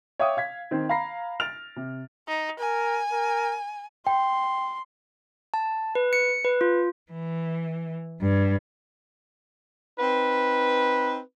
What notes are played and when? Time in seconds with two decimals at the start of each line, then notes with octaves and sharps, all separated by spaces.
0.19 C#5 E5 F5 G5 D6 D#6
0.37 F5 G#6 B6
0.71 D#3 C4
0.89 F5 A#5 B5 A#6 C7
1.40 F6 A6 D7 F7
1.76 C3
2.28 D#4
2.60 A#4 G#5
3.12 A#4
4.07 G5 C6
5.54 A5
5.95 B4
6.13 C#7
6.45 B4
6.61 F4
7.13 E3
8.21 G2
9.99 C4 D#4 B4